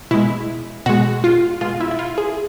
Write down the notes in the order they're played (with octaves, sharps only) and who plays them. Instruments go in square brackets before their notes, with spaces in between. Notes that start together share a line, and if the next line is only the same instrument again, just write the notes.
[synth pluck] B2 G#3 E4
B2 G#3 F#4
F4
B2 G#3 F4
E4
E4
F4
G#4